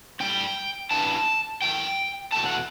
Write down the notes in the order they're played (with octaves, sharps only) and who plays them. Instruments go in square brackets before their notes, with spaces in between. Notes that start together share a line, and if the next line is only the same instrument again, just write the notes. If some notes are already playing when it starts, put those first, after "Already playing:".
[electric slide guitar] A2 G3 B3 G5
G2 E3 G3 B3 A5
F#2 E3 A3 G5
E2 B2 A3 A5
F#5